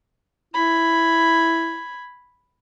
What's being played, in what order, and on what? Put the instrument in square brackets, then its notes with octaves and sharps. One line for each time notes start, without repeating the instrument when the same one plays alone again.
[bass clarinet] E4 [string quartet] B5 G#6